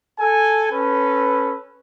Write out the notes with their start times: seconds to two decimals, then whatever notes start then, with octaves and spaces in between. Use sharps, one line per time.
0.19 A4 G#5
0.72 C#4 A4 B4